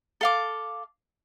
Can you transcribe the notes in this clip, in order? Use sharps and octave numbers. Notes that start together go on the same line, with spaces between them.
A4 F5 D6